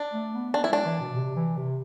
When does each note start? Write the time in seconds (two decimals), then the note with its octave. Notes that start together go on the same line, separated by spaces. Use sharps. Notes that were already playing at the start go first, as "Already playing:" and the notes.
Already playing: D4
0.14 A3
0.34 B3
0.54 B3 D4
0.64 E4
0.70 G#3 D4
0.85 E3
1.00 B2
1.16 C3
1.36 E3
1.57 C3